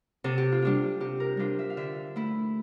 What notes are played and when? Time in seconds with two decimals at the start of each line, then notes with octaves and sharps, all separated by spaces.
0.24 C3 A4
0.38 G4
0.52 F4
0.62 G3 D4 F4 G4
1.00 C3 G4
1.20 A#4
1.37 G3 D4 F4 C5
1.59 E5
1.70 F5
1.77 D3 E5
2.16 A3 E4